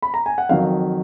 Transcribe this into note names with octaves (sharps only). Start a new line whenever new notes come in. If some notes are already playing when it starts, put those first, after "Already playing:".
B5
A#5
G#5
F#5
F2 D#3 F#3 F5